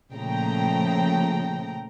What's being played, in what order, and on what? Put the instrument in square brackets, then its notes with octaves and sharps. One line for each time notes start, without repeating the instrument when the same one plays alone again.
[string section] A#2 C#3 F3 A3 G5 A#5